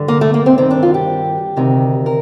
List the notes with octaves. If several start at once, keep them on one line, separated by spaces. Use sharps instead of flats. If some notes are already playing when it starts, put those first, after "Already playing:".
Already playing: G2 D3
A#3
A3
A#3
C4
G2 D#3 C4
D4
F4
G4
D2 C3 D#3
A#4